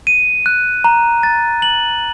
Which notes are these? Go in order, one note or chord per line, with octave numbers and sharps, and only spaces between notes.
D#7
F#6
A#5
A6
F#7